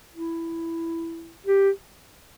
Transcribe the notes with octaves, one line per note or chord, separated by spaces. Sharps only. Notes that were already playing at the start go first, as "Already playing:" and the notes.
E4
G4